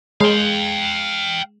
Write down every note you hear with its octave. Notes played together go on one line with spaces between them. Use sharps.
G#3 F5 G5